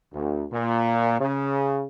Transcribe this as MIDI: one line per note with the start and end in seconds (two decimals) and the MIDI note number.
0.13 0.45 38
0.51 1.16 46
1.19 1.85 49